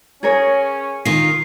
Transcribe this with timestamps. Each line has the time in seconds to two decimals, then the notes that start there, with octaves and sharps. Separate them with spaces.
0.23 C#4 G#4 A#4 C#5
1.05 D#3 F4 C7